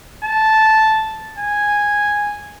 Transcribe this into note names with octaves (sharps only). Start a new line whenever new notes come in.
A5
G#5